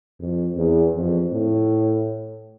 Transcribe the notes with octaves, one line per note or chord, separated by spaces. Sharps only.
F2
E2
F2
A2